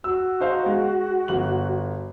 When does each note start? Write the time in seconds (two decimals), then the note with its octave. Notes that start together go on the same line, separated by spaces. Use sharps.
0.04 F#4 E6
0.40 D#4 C5 F5
0.66 G#3
1.28 G1 F#7